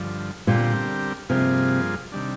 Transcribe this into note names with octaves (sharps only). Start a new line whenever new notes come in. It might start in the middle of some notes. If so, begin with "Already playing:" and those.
Already playing: G2 D3 F3
A#2 D3 G3 C4 G4 A#4
G2 C3 F3 A#3 F4 G#4
C3 D#3 G3 D4